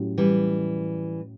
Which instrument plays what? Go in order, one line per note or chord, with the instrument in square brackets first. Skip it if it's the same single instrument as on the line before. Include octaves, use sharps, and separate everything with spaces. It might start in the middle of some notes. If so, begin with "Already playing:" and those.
Already playing: [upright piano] A2 F#3 C#4 E4 G4
[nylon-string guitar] E3 G3